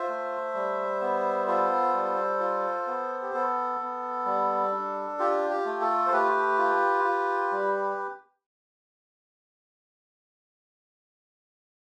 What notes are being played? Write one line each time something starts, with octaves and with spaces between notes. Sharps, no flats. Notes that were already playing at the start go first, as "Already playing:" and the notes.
Already playing: F4 C5 E5
A3
G3
B3
F4 A4 C5
G3
F4
B3
G4
B3 A4
B3
G3
D4
F4 G4
G4
A3
A4
C5
A3 G4 B4
F4
F4
G3